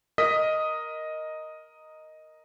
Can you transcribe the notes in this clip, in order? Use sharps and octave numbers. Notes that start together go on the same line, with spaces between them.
A#4 D#5 D#6 B6